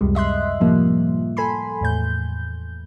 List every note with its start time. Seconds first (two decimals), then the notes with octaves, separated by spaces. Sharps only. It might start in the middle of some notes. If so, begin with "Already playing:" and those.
0.01 C#2 F#2 C3 G3 G#3
0.15 D#5 E5 C6 F#6
0.60 A2 C3 F3 G3 A#3
1.37 A4 G#5 B5 C6
1.81 E2 A2 G6